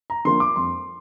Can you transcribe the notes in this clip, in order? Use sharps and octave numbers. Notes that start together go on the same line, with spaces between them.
A#5
D3 F3 A#3 C6
D6
F2 C6